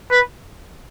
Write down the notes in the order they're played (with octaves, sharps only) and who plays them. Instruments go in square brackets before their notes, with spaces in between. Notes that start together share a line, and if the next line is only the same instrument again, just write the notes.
[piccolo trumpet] B4